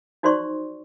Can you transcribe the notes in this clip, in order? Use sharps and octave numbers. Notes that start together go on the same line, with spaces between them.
D#4 F#4 C5 D5 C6 C#6